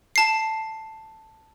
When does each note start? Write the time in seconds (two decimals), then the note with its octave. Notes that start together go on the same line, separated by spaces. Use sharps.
0.16 A5 C7